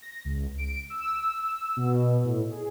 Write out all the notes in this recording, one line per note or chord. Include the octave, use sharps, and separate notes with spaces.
A#6
C#2
D7
E6
B2
A2
G#4